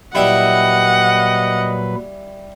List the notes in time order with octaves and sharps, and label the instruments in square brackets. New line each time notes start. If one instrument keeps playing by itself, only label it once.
[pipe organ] A#2 F#3 B4 [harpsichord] G3 E4 G5 [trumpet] D#5 [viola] F#5